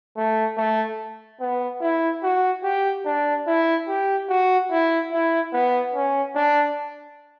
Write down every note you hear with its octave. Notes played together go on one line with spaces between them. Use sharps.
A3
A3
B3
E4
F#4
G4
D4
E4
G4
F#4
E4
E4
B3
C#4
D4